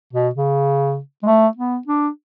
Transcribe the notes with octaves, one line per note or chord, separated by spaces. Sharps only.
B2
C#3
G#3
A3
B3
D4